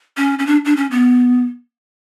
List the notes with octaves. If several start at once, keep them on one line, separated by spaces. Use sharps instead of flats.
C#4
C#4
D4
D4
C#4
B3